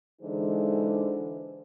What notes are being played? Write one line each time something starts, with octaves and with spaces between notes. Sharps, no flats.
D3 E3 G#3 D#4 G#4 C5